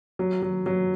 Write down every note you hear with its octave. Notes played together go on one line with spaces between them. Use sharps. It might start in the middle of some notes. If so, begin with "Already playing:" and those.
F#3
F#3
F#3